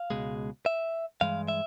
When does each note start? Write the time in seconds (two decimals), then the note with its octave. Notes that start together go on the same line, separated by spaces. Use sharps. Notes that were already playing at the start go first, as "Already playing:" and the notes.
Already playing: F5
0.10 C#2 B2 G#3
0.66 E5
1.21 G2 E3 G#3 F5
1.48 E5